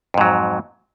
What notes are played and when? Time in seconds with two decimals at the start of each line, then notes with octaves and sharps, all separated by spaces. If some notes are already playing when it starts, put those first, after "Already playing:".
0.14 F2
0.18 G#2
0.21 F#3